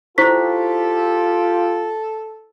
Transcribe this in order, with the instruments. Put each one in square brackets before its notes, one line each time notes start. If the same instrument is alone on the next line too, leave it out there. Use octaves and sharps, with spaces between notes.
[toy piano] E4 C5 C#6 [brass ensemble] F4 G4 [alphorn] A4 [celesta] B6